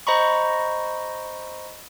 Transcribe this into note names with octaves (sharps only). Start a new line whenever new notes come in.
C5 D#5 A#5 B5 C#6